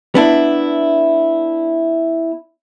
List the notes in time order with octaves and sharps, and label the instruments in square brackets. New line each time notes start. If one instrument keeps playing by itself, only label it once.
[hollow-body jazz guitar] B3 D4 E4